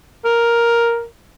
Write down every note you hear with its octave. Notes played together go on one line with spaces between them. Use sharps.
A#4